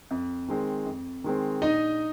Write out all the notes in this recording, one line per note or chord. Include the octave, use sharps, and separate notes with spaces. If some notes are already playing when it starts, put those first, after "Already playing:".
F2
D#3 G#3 C4
F2
D#3 G#3 C4
A#1 D#4 D#5